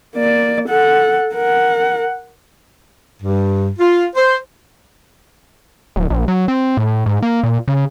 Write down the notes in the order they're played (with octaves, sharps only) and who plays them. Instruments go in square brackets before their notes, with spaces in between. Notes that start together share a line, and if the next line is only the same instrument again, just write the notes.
[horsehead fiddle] A#3 D5
A4 F#5
A#4 F#5
[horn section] G2
F4
C5
[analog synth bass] D1
A#1
F#3
C4
A2
G#2
A#3
A#2
C#3